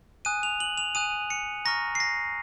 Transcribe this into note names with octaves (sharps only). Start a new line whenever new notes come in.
G#5 D#6 F#6 D#7
F7
F#7
F7
G#5 D#6 F#6 D#7
C#7
A#5 C#6 F6 A#6
C7
A#6